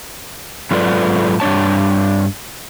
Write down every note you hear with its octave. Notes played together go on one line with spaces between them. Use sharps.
G#2 F#3 F4 A4 B4 D5
G2 D4 C#5 A5